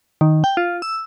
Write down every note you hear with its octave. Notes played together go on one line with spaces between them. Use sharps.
D#3
G5
F4
E6